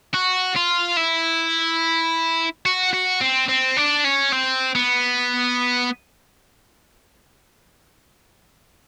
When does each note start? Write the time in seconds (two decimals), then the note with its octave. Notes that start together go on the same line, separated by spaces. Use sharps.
0.14 F#4
0.56 F4
0.97 E4
2.66 F#4
2.94 F#4
3.21 C4
3.48 C4
3.77 D4
4.05 C#4
4.32 C4
4.75 B3